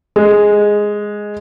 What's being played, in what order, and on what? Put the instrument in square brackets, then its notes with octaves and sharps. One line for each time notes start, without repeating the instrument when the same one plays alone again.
[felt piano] G#3